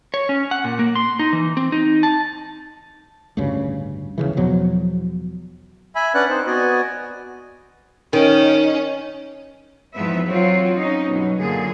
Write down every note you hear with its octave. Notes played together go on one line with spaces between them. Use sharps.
C#5
C#4
F#5
A#2
A#3
C6
D#4
E3
C4
D#4
A5
A1 D2 G2 C#3
E1 D2 C#3 E3
E2 B2 F3 F#3
E5 G#5 B5
C#4 D4 B4 D5 F#5 F#6
C4 D#4 C5
B3 F#4 D5 D#5 G#5
D#3 C#4
E2 G#2 F3 B3 B4 E5
F#3 C4 F4
C#4 D#4
G2 B2 F#3
F#2 A#2 D3 G#4